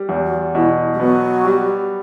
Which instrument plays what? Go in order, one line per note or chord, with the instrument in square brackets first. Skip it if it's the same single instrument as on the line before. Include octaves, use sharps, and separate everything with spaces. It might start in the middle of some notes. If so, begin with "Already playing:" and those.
Already playing: [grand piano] G3
E2
[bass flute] F#3
[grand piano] B2 [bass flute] E3
[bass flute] G3
[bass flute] F#3 [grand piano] B3
[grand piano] G3